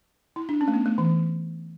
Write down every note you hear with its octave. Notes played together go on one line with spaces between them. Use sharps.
E4
D4
C#4
A3
B3
A3
E3